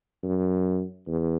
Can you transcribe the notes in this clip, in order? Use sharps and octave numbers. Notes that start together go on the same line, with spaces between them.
F#2
E2